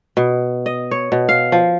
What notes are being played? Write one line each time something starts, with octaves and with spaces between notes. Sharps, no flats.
B2
D#5
C#5
B2
F5
F3